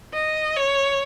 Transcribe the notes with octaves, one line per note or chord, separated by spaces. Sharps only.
D#5
C#5